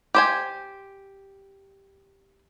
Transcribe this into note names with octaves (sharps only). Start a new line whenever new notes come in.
G4 C5 G#5